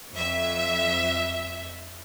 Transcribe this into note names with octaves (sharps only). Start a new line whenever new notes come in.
F2 E5